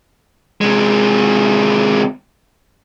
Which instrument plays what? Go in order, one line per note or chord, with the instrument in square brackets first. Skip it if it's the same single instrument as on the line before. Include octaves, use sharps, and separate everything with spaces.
[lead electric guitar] C3 G#3